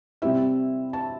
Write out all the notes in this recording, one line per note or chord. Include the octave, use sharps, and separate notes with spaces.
C3 G3 C4 E4 E5
A5